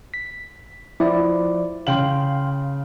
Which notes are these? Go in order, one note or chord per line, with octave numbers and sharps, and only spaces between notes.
B6
F3 E4 D5
C#3 F5 G5 C6 F#7